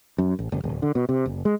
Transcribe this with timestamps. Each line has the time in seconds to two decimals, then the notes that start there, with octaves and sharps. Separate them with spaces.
0.18 F#2
0.39 A1
0.52 F#1
0.64 D1
0.82 D3
0.95 B2
1.09 C3
1.26 F#1
1.45 G#3